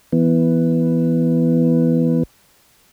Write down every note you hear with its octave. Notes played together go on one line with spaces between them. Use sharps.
E3 B3